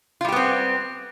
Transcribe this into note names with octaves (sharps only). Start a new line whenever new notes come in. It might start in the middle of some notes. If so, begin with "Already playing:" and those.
G3 B3 C4 F4 G4